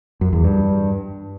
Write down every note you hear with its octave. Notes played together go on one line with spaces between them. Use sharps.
F#2
E2
G2